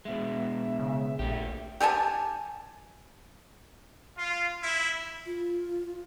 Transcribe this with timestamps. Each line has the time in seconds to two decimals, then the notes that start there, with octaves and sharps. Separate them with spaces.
0.05 B2 G#3 E5
0.79 C#3
1.19 A#1 A3 G4
1.80 G4 A4 G#5 A5
4.17 F4
4.63 E4
5.26 F4